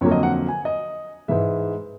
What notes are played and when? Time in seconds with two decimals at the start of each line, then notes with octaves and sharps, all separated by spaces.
0.01 F2 D3 F#3 A#3 C#5
0.11 D#5
0.23 F#5
0.48 G#5
0.65 D#5
1.28 G#2 E3 G#3 E5